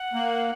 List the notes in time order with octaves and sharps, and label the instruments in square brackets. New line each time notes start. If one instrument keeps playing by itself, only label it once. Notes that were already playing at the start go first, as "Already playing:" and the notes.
Already playing: [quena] F#5
[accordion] A#3